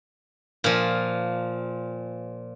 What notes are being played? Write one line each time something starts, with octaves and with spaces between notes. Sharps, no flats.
A#2 F3